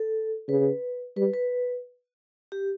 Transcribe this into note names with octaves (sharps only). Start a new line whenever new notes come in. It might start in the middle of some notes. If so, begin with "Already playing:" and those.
Already playing: A4
C#3 B4
G3 B4
B4
G4